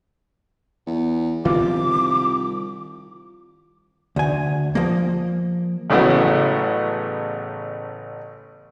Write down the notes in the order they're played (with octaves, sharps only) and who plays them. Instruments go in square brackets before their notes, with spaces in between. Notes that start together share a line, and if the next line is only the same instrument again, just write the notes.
[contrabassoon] E2
[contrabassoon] C2 [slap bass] D#3 F3 C4 [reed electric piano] F4 [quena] D6
[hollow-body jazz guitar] D2 G#5
F3 A#3
[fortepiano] A1 A2 C#3 F#3 B3